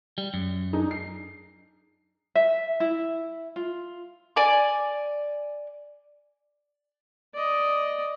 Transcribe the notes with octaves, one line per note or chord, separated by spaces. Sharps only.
G3
F#2
D4 D#4 G#4
C7
E5
E4
F4
D5 G#5 D6
D5 D#5